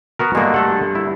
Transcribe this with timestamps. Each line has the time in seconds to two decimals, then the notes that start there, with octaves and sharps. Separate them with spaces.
0.19 B3 F#4 A#4
0.35 G2 D3 G#3 A#3 F#4
0.54 A3 A4 F#5
0.95 E4